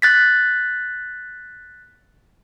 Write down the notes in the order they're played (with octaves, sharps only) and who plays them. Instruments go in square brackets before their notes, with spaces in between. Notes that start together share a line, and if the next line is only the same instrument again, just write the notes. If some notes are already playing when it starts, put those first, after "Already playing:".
[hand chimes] F#6 A6 B6